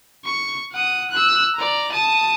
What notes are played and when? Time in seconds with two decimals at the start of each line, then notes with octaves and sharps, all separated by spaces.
0.25 C#6
0.72 F#5 D#6
1.11 E6 F#6
1.56 D5 A#5
1.92 A5 D#6